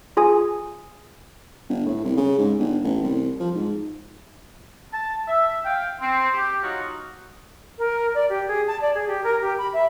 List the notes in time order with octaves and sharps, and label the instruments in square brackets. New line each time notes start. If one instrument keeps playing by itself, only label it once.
[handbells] F4 G#4 G#5 D#6
[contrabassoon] G1
A2
C2
C#3
G#2
G1
A1
C2
F3
G#2
[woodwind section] A5
E5
F5 G5
C4
G4
F#3 D#4 F4 F#4
[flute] A#4
D5
G4
G#4
A5
D5
G#4
G4
A#4
G4
B5
E5